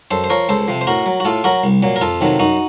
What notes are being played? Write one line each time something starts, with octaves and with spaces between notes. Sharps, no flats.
F#2 A4 C5
C5
F3 A#4 C#5
C#2 A4 C5
C3 F3
C5
A2 F#4 A#4
F#3
F#4
A2 F4 A4
F#3 F#4 A#4
C2
A#2 F#3
A#4
F2 F4 A4
C3 D#3 F#3
F#2 D#4 F#4